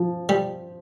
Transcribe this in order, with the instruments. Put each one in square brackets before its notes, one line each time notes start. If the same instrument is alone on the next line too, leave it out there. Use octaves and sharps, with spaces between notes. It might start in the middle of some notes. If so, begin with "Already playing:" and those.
Already playing: [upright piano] F3
[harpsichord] G3